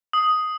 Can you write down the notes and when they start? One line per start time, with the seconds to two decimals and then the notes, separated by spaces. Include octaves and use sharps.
0.13 D#6